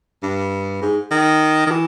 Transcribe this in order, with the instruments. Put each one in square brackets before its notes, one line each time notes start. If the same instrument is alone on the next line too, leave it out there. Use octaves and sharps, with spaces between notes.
[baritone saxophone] G2
G#2
D#3
D#3
E3